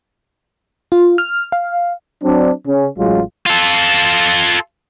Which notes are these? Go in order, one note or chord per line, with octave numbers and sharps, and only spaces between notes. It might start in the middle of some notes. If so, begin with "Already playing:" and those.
F4
F6
F5
F#3 C4 D4
C#3 C#4
A1 F#3 G#3 F4
F4 A4